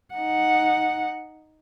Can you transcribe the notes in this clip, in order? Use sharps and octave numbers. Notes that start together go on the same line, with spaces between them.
D#4 F#5